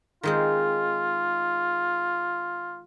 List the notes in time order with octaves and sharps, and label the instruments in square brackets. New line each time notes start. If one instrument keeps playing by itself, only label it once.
[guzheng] D#3 G#3 C4 [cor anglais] F4